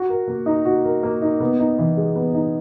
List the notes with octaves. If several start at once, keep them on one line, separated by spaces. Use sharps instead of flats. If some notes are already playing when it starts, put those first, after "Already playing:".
Already playing: F#4
A#4
A#3
D#4
F#4
A#4
A#3
D#4
B3
D#4
E3
G#3
B3
D#4